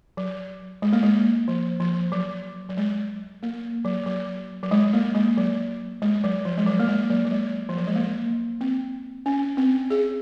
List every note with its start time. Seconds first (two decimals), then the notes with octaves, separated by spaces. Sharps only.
0.17 F#3
0.82 G#3
0.93 A#3
1.03 G#3
1.48 F3
1.80 F3
2.12 F#3
2.69 F#3
2.77 G#3
3.43 A#3
3.85 F#3
4.06 F#3
4.63 F#3
4.71 G#3
4.93 A#3
5.15 G#3
5.37 F#3
6.02 G#3
6.24 F#3
6.45 F3
6.58 G#3
6.67 F#3
6.79 A#3
6.88 G#3
7.10 F#3
7.25 F#3
7.32 G#3
7.69 F3
7.77 F#3
7.87 G#3
7.95 A#3
8.61 C4
9.26 C#4
9.57 C4
9.90 G#4